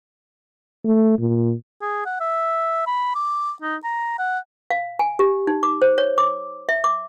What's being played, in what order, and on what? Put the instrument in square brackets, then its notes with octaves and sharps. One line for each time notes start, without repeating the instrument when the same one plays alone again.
[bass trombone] A3
A#2
[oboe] G#4
F#5
E5
B5
D6
D#4
A#5
F#5
[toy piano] F5
G#5
G4
D#4
D6
C5
C#5
D6
E5
D6